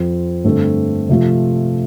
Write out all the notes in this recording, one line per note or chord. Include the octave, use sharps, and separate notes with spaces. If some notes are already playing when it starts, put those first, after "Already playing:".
Already playing: F2 F3 C4
G2 D3 A3 C4 A4
C3 F3 A3 F4